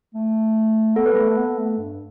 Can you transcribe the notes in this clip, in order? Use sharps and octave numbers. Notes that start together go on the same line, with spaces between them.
A3
B3 A4
B4
G3
A3 A4
A3
B3
A3
G2